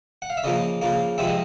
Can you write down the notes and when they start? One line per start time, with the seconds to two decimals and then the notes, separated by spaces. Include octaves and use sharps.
0.22 F#5
0.30 F5
0.37 E5
0.44 C#3 F3 A#3 D#5
0.81 C#3 F3 A#3
1.18 C3 F3 G#3 C4 E5
1.27 D#5